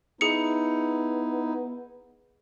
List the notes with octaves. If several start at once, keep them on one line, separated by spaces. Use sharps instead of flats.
B3 D#4 E4 G#4 C#7